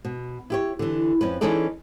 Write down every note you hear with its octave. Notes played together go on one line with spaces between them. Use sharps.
B2
E4 G4 C#5
D3 E3
F2 C#4 B4
E3 C#4 D#4 G#4 A4 D5